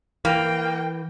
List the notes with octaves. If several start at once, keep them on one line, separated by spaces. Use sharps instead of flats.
E3 A#3 G5